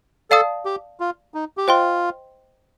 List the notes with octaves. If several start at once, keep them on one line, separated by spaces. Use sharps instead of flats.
A4 D5 F5 A5 D#6
G4
F4
D#4
G4
F4 C5 D#5 G5 C6